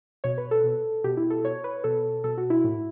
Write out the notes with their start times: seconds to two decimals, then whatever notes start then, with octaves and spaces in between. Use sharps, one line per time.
0.24 B2 C#5
0.38 B4
0.51 A4
0.64 B2
1.04 B2 G4
1.17 E4
1.30 A4
1.44 B2 C#5
1.64 B4
1.84 B2 A4
2.24 B2 A4
2.38 F#4
2.50 E4
2.64 A2